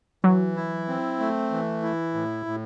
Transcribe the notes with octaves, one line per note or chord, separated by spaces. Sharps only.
E3 F#3
E4
C4
A3
E3
E4
A2
A2